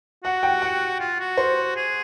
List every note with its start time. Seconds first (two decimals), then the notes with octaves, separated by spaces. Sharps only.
0.24 F#4 F#5
0.43 G5
0.62 F#5
1.00 F4
1.20 F#4
1.37 C5
1.76 G#4